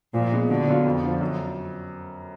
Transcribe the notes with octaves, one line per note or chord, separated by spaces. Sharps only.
A#2 F3
G#3 B3
B2 D3
F#3 B3 F4
F2
D3 F3
F#2